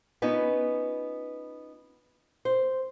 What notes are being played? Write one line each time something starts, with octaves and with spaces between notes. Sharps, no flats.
B3 C#4 D#4 F4 B4
C5